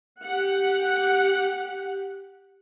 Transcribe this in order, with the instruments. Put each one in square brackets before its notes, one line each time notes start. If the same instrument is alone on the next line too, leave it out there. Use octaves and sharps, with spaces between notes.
[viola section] G4 F#5